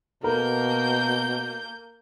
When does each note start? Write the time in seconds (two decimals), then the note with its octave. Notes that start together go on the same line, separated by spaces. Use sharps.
0.23 B2 A#3 A4 A#4 G6